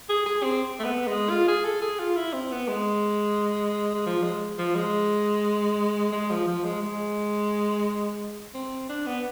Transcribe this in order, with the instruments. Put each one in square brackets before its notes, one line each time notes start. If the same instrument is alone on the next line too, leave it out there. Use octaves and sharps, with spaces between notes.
[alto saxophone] G#4
G#4
C4
A3
B3
G#3
F4
G#4
A4
G#4
F4
E4
C4
B3
G#3
G#3
F3
G#3
F3
G#3
G#3
F3
F3
G#3
G#3
C4
D4
B3